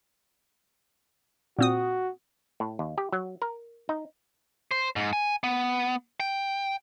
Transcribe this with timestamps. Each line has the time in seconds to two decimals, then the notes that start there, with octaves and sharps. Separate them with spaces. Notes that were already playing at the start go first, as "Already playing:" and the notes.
1.59 A#2 C4 F#4 D#6
2.60 A2
2.79 D#2
2.98 G4
3.12 F#3
3.42 A#4
3.89 D#4
4.71 C5
4.96 G#2
5.13 G#5
5.44 B3
6.20 G5